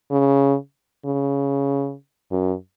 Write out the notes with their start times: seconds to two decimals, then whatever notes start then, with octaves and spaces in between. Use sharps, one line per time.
0.11 C#3
1.05 C#3
2.32 F#2